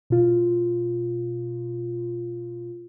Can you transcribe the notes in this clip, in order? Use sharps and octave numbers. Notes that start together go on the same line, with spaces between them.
B2 F4